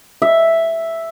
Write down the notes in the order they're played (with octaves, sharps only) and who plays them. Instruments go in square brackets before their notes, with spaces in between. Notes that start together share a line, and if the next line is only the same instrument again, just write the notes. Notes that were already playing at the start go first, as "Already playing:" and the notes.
[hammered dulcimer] E5